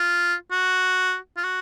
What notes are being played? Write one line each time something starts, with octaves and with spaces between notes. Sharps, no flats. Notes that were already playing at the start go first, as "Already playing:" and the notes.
Already playing: F4
F#4
F4
F#4